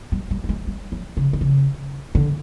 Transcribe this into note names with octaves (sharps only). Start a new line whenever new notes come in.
G3
G3
G3
G#3
G3
F#3
C#3
D3
C#3
D3